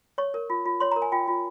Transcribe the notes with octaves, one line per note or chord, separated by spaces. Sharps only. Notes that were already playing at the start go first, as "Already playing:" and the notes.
C#5 C#6
A#4
F4
F4
C#5 C6
A#5
A#4
G#5
F4 G5
F4